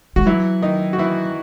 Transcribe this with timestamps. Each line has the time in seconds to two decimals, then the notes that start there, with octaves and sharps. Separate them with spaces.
0.16 G#3 F#4
0.26 E3 F#3 E4
0.62 D#3 D#4
0.93 F#4
0.98 E3 E4